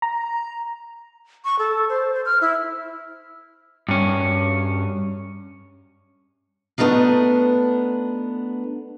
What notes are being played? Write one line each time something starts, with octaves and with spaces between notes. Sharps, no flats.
A#5
C#6
A4
C5
C5
F6
E4
G2 C#4
A3 B3 D4 D#4 F4